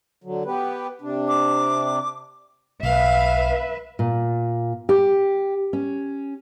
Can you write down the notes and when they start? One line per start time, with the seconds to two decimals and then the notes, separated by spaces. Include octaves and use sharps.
0.24 D3 F#3
0.45 B3 G4 B4
1.01 C3 D4
1.28 D6
2.83 B1 B4 E5 F5
3.99 A#2
4.89 G4
5.73 C#4